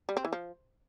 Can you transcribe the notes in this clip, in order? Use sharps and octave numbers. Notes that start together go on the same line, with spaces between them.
G3
C4
E3
F3